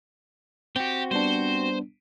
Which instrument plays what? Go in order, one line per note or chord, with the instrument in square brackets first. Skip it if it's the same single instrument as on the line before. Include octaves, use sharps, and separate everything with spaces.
[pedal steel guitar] C4 F#4 [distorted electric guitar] G4
[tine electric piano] G3 B3 D4 [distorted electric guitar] C5